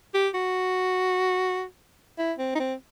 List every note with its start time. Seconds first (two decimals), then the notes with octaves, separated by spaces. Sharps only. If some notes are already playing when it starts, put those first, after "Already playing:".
0.14 G4
0.35 F#4
2.18 E4
2.39 C4
2.55 D#4
2.60 C4